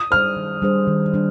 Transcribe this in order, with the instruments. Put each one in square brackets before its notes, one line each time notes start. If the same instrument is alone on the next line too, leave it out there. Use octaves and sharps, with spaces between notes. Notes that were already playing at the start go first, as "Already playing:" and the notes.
Already playing: [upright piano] D#6
[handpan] G3 D4 G#4 C5 [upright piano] F6
[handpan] D#3
G3 D4 G#4 C5
D#3
G3 D4